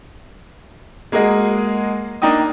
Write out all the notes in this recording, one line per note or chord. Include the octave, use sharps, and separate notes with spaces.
G#3 A#3 F#4 G#4 D#5
A#3 D4 D#4 G5 D#6